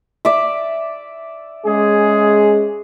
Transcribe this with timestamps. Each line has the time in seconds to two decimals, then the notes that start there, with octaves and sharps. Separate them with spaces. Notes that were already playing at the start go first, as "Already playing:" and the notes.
0.25 D5 E5
1.65 G#3 C#4 G#4